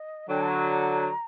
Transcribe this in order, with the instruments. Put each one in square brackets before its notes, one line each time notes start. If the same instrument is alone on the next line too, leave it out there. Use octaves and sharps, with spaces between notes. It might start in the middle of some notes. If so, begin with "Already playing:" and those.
Already playing: [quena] D#5
[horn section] D3 F#3 [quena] G5
[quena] A5
A#5